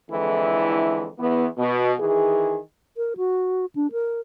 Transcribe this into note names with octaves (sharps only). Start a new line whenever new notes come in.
F2 D3 E3 G#3 E4
E2 E3 B3
B2
D#3 E3 G#4
A#4
F#4
D4
A#4